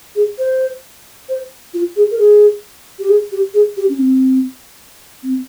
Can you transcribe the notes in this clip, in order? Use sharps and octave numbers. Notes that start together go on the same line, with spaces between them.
G#4
C5
C5
F4
G#4
A#4
G#4
G4
G#4
G4
G#4
G4
C#4
C4
C4